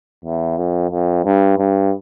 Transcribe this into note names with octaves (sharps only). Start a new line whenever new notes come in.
E2
F2
F2
G2
G2